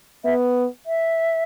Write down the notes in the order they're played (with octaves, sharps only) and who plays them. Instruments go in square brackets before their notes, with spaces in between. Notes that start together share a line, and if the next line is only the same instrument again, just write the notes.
[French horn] B3 [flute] E5
[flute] E5